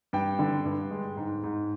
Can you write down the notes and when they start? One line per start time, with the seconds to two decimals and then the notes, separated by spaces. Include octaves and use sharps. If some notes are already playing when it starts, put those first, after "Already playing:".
0.13 G2 G5
0.39 D3
0.65 G2
0.90 G#3
1.17 G#2
1.43 G#2